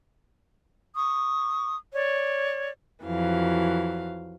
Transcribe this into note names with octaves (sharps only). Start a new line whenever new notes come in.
C#6 D#6
C#5 D5
F2 E3 F#3 F5